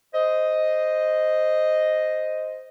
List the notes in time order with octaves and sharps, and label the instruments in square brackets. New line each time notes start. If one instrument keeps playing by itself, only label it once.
[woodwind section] C5 D#5